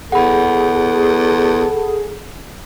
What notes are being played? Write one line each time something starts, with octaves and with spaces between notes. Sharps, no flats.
E2 G#4 A4 F#5 B5